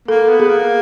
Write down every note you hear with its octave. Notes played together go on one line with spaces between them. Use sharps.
A#3 A4
B3
G#4
A#3